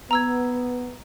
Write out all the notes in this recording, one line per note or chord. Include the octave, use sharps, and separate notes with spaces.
B3 A#5 E6 G#6